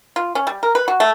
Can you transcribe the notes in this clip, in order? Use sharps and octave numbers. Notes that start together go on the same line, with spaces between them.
F4
C#4
G3
A#4
B4
F#4
A3